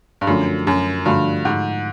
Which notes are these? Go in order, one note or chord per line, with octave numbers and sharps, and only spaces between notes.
G2
F#2 D3 F3 A3 D4 F#4
F#2
G2 D3 F3 A3 D4 F#4
G#2